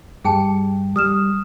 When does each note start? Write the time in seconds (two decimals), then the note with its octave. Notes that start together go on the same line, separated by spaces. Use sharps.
0.24 G2 G3 G#4 G5 A5
0.96 G3 D#6 F6 E7